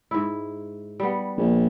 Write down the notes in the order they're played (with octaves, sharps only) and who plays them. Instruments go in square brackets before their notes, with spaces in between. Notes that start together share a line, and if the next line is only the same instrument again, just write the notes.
[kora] G#2 E4
G3 B3
[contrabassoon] A#1